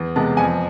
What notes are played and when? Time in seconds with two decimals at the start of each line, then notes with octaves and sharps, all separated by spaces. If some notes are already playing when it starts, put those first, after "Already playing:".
Already playing: E2
0.15 C3 G#3 B3 A5
0.37 F2 G#5